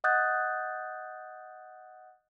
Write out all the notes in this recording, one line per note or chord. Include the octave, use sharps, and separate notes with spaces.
D#5 F#5 D#6 F#6 G6 A6